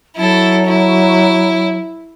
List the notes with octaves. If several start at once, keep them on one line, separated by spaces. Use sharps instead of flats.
F#3 E4 A4
E4